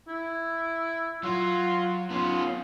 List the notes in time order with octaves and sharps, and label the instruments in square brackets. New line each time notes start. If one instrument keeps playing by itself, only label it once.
[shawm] E4
[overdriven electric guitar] F#3 [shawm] F4
[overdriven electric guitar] B3 C#4 [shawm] F4